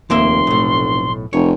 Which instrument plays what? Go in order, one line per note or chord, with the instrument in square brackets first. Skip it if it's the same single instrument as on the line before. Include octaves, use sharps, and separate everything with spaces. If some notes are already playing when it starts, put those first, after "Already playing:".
[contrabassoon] F1 [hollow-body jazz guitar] D#2 A#3 E5 [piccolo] C6
[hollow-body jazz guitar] B1 A2
[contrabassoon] F1 [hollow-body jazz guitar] C#5